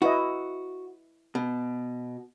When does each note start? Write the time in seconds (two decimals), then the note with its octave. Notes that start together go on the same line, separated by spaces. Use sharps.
0.02 E4 F#4 B4 D#5
1.35 B2